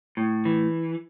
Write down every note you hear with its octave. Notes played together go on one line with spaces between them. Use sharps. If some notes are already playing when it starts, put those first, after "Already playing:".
A2
E3